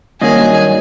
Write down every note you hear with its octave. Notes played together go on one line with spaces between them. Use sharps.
G2 D#3 F#3 A#3 C#4 G#4 D#5